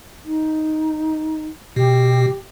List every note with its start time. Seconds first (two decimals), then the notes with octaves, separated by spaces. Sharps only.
0.25 D#4
1.76 B2 G4